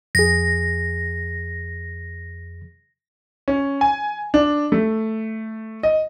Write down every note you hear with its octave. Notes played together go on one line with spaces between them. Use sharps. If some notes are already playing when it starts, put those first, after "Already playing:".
F2 G#4 A#6
C#4
G#5
D4
A3
D#5